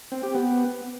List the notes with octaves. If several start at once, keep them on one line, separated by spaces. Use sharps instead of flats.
C4
G4
B3